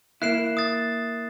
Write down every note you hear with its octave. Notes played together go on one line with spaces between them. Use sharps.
A#3 E4 F#6 C7 E7
D#6 A6